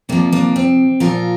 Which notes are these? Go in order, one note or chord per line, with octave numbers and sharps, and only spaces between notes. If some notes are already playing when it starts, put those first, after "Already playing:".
C3 F3 A#3 D4
A#3 D4
C4
A#2 F3 F4 A#4